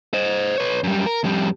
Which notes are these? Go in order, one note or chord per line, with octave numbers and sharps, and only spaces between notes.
C5 D#5
B4 C#5
F#2 G3
A#4
F2 G3